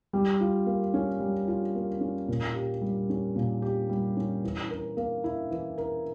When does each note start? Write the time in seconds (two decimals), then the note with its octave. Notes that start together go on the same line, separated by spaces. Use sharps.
0.13 G3
0.41 F4
0.66 A#3
0.94 C#4
1.20 G3
1.48 F4
1.75 A#3
2.01 C#4
2.28 A#2
2.55 G4
2.82 G3
3.10 C#4
3.35 A#2
3.62 G4
3.89 G3
4.17 C#4
4.44 E3
4.70 A#4
4.97 A#3
5.24 E4
5.51 E3
5.78 A#4